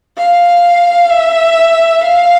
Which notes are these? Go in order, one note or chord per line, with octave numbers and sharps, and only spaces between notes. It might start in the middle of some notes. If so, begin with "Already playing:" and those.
F5
E5
F5